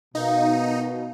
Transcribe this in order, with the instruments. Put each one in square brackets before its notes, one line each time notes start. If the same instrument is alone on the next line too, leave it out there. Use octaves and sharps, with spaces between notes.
[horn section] B2 [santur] A#3 F5 [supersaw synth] D#4